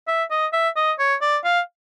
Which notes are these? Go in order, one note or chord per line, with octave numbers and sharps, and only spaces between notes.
E5
D#5
E5
D#5
C#5
D5
F5